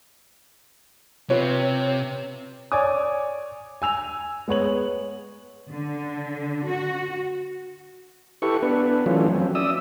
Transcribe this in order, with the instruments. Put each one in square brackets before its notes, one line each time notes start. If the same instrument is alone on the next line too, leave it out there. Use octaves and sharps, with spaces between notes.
[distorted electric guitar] C3 [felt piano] F4 B4 C#5
[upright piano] C#5 D5 G#5 D6 D#6
G#5 E6 F7
G#3 B3 C#5 F#7
[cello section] D3
F#4
[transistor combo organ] E4 G4 A4 B4 C#6
B3 D4 B4
E3 F#3 A3 C#4 F4
F3 F#3 C4 C#4
D5 E5 D#6 E6